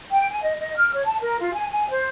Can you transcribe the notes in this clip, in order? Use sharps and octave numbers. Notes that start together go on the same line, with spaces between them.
G5
G#5
D#5
D#5
F6
C#5
A5
A#4
F4
G#5
G#5
C5